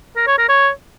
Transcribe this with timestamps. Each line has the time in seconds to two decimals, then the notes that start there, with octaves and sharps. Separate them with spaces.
0.16 A#4
0.27 C#5
0.38 A#4
0.49 C#5